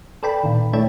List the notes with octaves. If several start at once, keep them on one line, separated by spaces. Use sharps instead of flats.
A4 B4 D5 G5 A5 B5
A#2 D#3
A3 D4 E4 C#5 G5 A5